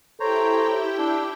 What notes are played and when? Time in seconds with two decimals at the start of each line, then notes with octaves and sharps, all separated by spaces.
0.20 E4 G4 A4 C5 C#5 G5 A#5
0.98 D4 E6